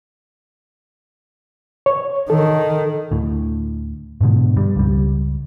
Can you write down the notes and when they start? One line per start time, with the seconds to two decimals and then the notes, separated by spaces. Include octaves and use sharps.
1.86 C#5
2.30 D#3 A4
3.12 D2 A2
4.21 G#2 B2 D3 G#3
4.57 G2 G3
4.76 C#2 G3